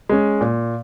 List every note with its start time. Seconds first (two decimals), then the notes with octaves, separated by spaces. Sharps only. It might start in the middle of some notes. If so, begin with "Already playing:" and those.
0.09 G#3 C#4
0.41 A#2